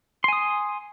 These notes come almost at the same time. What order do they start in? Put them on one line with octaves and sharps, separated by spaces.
C6 G#5 D#6